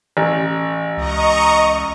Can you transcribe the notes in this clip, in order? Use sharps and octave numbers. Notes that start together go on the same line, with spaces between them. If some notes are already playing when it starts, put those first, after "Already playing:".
A1
C#2 D#5 A#5 C#6